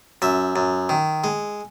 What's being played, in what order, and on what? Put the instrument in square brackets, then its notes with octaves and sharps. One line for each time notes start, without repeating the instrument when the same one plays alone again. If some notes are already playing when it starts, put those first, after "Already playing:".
[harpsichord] F#2 E5
F#2
D#3
G#3